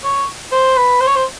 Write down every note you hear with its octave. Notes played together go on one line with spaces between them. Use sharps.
C#5
C5
B4
C5
C#5
C5